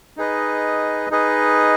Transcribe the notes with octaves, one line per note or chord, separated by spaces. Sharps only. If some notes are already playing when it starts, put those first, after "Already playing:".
D#4 G#4 B4 D#5
D#4 G#4 B4 D#5